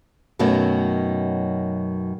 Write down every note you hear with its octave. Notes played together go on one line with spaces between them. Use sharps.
F#2 B2 D#3 F#3 A3